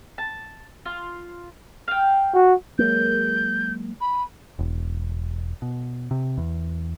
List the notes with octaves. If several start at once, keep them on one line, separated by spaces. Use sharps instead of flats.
A5
F4
F5 G5
F#4
F#3 G#3 A#3 G6
B5
E1
B2
C3
E2